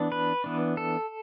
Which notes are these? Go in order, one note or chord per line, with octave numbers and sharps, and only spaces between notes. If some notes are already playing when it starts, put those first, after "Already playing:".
Already playing: E3 B3 D4
B4
E3 B3 D4
A4